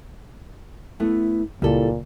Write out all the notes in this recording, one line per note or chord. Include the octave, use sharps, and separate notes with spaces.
A3 B3 E4
C#2 A#2 G3 E4 A4